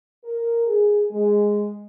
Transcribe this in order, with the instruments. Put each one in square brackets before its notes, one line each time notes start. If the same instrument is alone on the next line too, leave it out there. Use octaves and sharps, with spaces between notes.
[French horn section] A#4
G#4
G#3